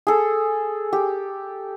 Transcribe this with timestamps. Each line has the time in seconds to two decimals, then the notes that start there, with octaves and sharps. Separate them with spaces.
0.07 G#4 A4
0.93 G4